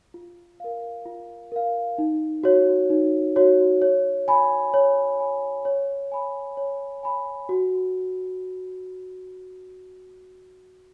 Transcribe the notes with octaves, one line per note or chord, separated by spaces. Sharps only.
F4
A#4 F5
F4
A#4 F5
D#4
F#4 C#5
D#4
F#4 C#5
C#5
G#5 B5
C#5
G#5 B5
C#5
G#5 B5
C#5
G#5 B5
F#4